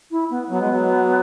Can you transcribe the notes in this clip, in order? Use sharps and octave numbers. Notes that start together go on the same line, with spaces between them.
E4
B3
F#3 B3
G#3
F#3